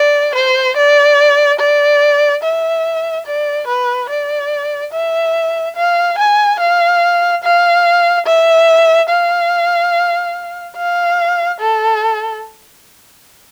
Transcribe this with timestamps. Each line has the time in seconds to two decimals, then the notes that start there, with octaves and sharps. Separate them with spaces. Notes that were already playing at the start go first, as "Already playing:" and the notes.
Already playing: D5
0.35 C5
0.77 D5
1.60 D5
2.43 E5
3.27 D5
3.68 B4
4.09 D5
4.93 E5
5.76 F5
6.18 G#5
6.60 F5
7.43 F5
8.26 E5
9.09 F5
10.77 F5
11.60 A4